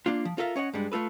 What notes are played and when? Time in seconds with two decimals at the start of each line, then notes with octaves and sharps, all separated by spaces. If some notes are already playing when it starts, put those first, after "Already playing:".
0.06 A#3 D4 F4
0.25 F3
0.38 F4 A4 A#4 E5 F5
0.56 C#4 C#5 D#5 F#5
0.74 G2 G3 G#3 D4
0.92 A3 F4 A4 B4